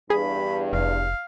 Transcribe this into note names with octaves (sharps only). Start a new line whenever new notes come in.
E2 G2 G#4 B5
F1 F5